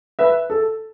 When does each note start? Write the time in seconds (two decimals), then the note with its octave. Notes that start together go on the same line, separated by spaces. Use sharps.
0.19 B4 E5
0.50 A4